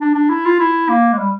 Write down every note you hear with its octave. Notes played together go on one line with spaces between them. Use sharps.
D4
D4
E4
F4
E4
A#3
G#3
G3